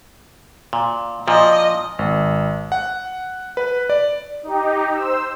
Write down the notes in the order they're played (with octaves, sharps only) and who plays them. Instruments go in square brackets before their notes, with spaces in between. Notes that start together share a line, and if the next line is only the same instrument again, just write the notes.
[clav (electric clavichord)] A#2
[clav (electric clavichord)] A#2 F3 [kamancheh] D#5
[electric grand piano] G#1
F#5
B4
D5
[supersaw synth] D#4 G4
C5 E6